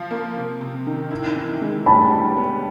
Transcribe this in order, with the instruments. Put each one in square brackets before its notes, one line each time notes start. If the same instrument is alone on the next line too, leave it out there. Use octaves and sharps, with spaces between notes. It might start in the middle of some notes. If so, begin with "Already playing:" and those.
Already playing: [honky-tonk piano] F3 F4
A#3
C3
C3
D#3
E4
E3
G#3
[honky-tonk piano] G4 [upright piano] A5 B5
[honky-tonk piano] G3
B3